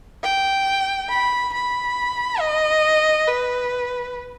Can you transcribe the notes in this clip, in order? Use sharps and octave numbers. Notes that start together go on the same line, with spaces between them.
G5
B5
B5
D#5
B4